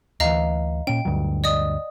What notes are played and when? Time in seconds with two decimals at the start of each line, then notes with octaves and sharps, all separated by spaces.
0.20 D2 E3 D#5 F5 A#5
0.87 A#2 C#4 G5
1.05 D2 G2 F#3
1.44 D5 D#5 D#6